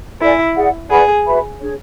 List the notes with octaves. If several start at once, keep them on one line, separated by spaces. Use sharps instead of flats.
E4 A4 D5 G#5
G#4 D5 F#5
G#4 B4 D5 F#5 B5
F#4 B4 E5 B5
D4 G#4 C#5